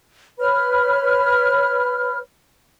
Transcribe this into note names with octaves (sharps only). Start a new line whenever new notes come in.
B4 C#5 B5 F6